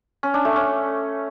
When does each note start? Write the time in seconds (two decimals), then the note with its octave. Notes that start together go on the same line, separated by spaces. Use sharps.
0.23 C#4
0.34 D4
0.45 A3
0.56 C#4